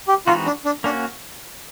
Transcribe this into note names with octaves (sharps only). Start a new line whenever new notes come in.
G4
E3 G#3 C4 D#4 F4 F#4
D4
D4
A#3 C#4 D4 F#4